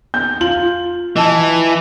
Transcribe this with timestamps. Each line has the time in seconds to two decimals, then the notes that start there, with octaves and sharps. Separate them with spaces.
0.14 B3 G6
0.41 F4 F#7
1.16 E3 D#5 A5